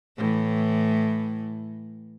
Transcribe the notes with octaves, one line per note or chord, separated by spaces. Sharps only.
A2 E3